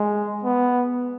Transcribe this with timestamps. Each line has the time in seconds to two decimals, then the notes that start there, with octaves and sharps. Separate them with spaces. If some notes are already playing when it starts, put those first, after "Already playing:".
Already playing: G#3
0.44 B3